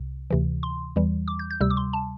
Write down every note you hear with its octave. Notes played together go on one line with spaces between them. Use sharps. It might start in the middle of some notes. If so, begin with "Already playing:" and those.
Already playing: C2 C3
D2 C3 E3
C6
E2 E3 G3
D6
G6
G6
D2 C3 G3 E6
D6
C6
A5